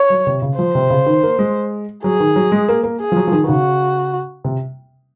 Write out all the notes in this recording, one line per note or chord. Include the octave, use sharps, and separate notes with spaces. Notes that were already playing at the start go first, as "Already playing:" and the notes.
Already playing: C#5
F#3
C3
C#3
F3 C5
C3
C#3
D#3
A#3
G#3
F#3 G#4
D#3
F#3
G#3
A#3
A#3
G#4
F3
F#3
F3
D#3
D#3
C#3 F#4
C3